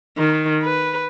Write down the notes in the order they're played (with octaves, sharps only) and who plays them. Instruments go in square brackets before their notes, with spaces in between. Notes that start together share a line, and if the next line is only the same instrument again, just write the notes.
[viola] D#3
B4